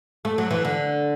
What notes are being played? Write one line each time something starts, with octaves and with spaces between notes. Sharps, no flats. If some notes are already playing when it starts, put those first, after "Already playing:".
A3
F#3
E3
D3